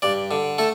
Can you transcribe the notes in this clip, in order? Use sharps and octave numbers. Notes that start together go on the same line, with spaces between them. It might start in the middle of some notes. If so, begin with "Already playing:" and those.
G2 D5
D3
A3 A4